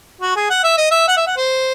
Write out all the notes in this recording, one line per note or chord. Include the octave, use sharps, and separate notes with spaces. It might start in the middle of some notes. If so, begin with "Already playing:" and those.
F#4
G#4
F#5
E5
D#5
E5
F#5
E5
F#5
C5